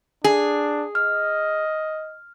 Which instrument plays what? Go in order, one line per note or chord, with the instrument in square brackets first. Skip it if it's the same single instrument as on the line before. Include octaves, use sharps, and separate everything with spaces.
[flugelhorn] D4 [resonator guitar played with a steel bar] G#4
[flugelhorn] D#5 [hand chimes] F6